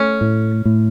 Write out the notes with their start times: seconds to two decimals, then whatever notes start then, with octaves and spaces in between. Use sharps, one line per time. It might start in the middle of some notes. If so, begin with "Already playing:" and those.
Already playing: A3 C#4
0.21 A2
0.65 A2